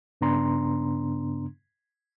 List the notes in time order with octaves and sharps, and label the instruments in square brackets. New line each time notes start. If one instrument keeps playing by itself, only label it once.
[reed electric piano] G2 C#3 B3 D4 A#5 C6